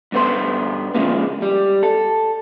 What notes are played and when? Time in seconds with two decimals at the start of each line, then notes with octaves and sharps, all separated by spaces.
0.12 G2 D3 B3 C5 C6
0.95 A#2 C#3 F3 G#3 A#3
1.42 G3
1.83 A4